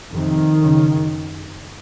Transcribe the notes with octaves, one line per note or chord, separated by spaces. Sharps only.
F2 C3 D#3
F#2 C#3